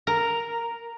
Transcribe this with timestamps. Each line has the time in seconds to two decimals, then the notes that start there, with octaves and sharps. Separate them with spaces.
0.07 A#4